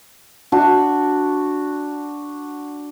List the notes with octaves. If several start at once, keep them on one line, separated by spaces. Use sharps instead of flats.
D4 F#4